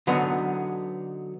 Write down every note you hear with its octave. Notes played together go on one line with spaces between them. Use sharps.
D3 F#3 B3 D#4